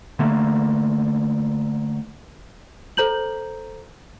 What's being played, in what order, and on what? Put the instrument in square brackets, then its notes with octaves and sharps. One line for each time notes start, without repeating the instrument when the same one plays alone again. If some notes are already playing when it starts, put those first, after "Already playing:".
[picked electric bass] D3 A3 A#3
[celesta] A4 C5 A#5 G6 F#7